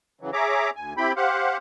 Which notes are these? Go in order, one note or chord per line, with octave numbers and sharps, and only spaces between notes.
C#3 E3 F#3
G#4 C#5 E5 A#5 D6
D2 G#5
C4 E4 G4 G5 B5
G4 C5 F5 F#5